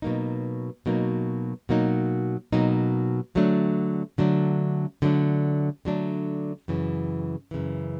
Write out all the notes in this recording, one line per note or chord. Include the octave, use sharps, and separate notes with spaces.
B2 F#3 A#3 D#4
B2 F#3 A#3 D#4
B2 F#3 A#3 D#4
B2 F#3 A#3 D#4
D3 F#3 A3 D4
D3 F#3 A3 D4
D3 F#3 A3 D4
D3 F#3 A3 D4
F#2 C#3 E3
F#2 C#3 E3